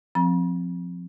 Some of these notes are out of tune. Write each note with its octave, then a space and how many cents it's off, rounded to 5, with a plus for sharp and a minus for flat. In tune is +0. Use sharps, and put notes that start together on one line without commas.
F3 +15 C4 +0 B5 -45